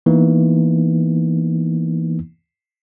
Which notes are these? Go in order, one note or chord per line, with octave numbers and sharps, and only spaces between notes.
E3 A#3 B3 D#4